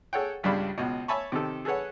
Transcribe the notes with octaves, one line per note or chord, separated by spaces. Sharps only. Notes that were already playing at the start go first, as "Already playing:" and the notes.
G#4 A4 C#5 F#5 G5
C#2 G2 C#3 G3 D4 B5
C#2 B2
C#5 E5 G#5 A5 B5 C#6
C3 D#3 A4
G#4 A4 B4 C#5 F#5